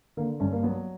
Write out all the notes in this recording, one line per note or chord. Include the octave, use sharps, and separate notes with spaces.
D3 A#3
G2 C#4
A#3
F#3 B3